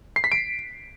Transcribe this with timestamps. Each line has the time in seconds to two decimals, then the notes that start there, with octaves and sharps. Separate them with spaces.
0.16 C7
0.24 B6
0.32 D7